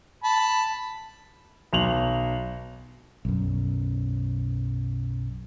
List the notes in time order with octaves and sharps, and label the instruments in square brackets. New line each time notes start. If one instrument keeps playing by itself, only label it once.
[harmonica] A5 B5
[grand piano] B1 F#3 F7 F#7
[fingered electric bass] B1 F#2